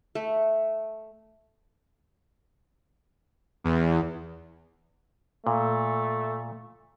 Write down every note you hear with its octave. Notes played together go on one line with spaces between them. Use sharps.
A3
E2
A#2 A3